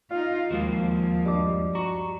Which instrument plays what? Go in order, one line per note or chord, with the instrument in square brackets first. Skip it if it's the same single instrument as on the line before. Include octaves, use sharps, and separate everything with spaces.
[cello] D#4 F4 [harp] F5
[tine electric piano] D#2 [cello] F3 [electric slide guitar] G#3 A#3 F#4
[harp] G2 D#5 D6
[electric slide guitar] F#4 [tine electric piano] A#5 C#6